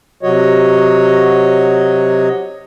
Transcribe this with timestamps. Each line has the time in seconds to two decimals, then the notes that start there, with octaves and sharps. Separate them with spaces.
0.23 C3 F#3 F#4 C#5 D#5